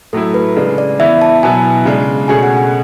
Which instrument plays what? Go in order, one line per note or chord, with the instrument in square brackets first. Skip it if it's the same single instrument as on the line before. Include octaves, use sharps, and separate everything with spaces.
[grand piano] A2 F#3 A3 E4 [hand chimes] A4
[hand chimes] B4
[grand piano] C#3 G#3 D4
[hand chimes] D5
[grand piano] E3 B3 E4 [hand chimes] E5
[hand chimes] A5
[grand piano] B2 F#3 B3 E4 [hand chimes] G#5
[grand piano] C#3 G#3 D4
[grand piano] B2 A3 C#4 G#4 [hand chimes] G#5
[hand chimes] F#5
F#5